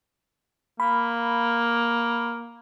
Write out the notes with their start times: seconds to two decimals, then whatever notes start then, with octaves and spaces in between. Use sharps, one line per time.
0.80 A#3 B5